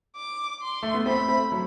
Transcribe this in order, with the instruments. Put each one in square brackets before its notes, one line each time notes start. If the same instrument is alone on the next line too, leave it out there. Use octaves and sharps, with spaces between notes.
[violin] D6
C6
[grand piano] A3
B3
[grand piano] A3 C4 [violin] B5
[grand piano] A3 C4
F#3 A3